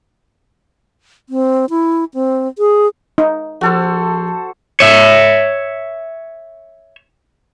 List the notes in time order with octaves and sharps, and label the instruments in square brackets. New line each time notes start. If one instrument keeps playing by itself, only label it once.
[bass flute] C4
E4
C4
G#4
[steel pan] D#4
[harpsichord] A#1 [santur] F#4 A4 C5
[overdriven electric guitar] C#5 E5